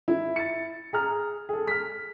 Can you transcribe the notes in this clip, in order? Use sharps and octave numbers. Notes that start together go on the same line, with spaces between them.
E4
A6 C#7
G#4 A#5 F6
G#4 A4
F6 B6